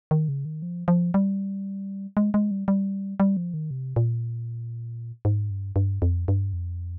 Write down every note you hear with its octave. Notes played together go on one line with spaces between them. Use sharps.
D#3
C#3
D#3
F3
F3
G3
G#3
G#3
G3
G3
G3
F3
D#3
C3
A#2
G#2
G2
G2
F2
G2
F2